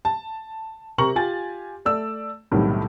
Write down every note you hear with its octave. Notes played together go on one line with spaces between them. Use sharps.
A5
C3 G4 A#4 A#5 C#6 F#7
F4 G4 G#5 A6
A3 D5 E6
B1 A2 C3 D#3 G3